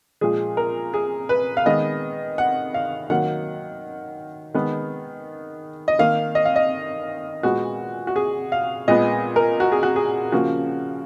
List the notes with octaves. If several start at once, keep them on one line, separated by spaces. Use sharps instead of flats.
A#2 F3 G#3 G#4
A#4
G#4
B4
F5
D#3 G#3 B3 D#5
F#5
F5
D#3 F#3 A#3 F#5
D#3 G#3 B3
D#5
D#3 A#3 F5
D#5
F5
D#5
A#2 G#3 B3 F#4
F#4
G#4
F5
A#2 G#3 B3 D#5
A#4
F#4
G#4
F#4
G#4
C#3 F3 A#3 F#4